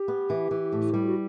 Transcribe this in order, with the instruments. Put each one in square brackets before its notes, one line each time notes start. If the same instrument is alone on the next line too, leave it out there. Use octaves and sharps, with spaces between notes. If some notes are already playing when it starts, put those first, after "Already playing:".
Already playing: [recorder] G4
[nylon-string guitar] B3
E3
E3
A2
G3
[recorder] F#4